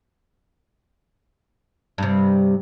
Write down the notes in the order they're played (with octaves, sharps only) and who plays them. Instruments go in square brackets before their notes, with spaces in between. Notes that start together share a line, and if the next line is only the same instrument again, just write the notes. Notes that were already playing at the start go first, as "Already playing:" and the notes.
[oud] G2 C3